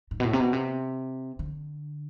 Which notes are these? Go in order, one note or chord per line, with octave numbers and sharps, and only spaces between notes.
G#2
B2
A2
C3
B2
C3
D3